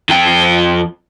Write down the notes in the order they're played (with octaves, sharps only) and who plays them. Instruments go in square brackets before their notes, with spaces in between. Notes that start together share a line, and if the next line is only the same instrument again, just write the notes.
[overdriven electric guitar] F2 G5